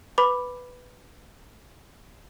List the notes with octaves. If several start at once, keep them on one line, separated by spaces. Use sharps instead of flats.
B4 B5 D6